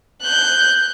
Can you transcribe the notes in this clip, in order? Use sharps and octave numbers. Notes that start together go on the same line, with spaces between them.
F#6 G6